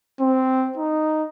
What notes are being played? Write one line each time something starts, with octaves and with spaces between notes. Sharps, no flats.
C4
D#4